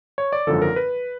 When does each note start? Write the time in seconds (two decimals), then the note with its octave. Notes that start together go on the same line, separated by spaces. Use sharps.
0.18 C#5
0.33 D5
0.47 G#1 F#2 D3 F3 A4
0.62 A#4
0.76 B4